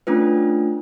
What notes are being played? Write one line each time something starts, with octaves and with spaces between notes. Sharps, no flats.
A3 C#4 D4 F4 B4